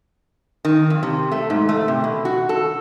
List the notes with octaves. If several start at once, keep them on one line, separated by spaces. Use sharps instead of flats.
D#3
F2
C3
A3
G#2
A3
C3
B2
F#4
A4